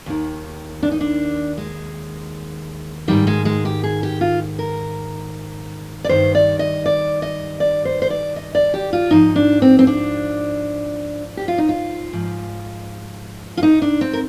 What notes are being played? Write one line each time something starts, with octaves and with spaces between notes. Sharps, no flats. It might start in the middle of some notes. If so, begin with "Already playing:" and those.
D#2 D#3
D4
D#4
D4
G#3
G#2 D#3 G3
G#3
G#3
G4
G#4
G4
F4
A#4
D5
G2 D#3 C5
D5
D#5
D5
D#5
D5
C5
C5
D5
D#5
D5
G4
F4
G#2 F3 D#4
D4
C4
C4
D4
G4
F4
D#4
F4
G#2 F3
F4
D#4
D4
C4
A#4